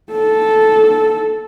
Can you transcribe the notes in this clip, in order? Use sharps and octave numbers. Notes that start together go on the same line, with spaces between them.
A4